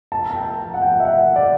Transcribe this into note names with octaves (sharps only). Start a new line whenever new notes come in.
A5
A5
G5
A5
F#5
G5
E5
F#5
D5